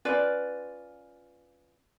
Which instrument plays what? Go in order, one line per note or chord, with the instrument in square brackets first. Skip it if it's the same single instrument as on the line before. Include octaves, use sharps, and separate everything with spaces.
[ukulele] C#4 F4 B4 D5